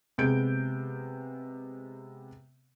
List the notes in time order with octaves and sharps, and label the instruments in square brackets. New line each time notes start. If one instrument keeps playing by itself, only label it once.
[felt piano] C3 G#3 B3 G6 D7